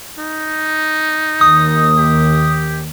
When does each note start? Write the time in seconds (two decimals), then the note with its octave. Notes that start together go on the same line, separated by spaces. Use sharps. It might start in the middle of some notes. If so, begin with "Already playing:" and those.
0.19 D#4
1.41 D#2 D#6
1.98 G4